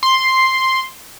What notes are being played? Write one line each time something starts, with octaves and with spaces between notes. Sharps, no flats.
C6